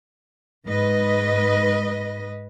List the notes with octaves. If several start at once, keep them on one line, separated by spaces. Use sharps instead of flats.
G#2 B4 D#5